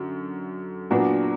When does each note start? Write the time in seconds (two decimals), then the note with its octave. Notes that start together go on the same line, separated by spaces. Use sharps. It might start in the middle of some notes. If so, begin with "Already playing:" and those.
Already playing: F#2 D3
0.90 A#2 F#3 B3 D4 F#4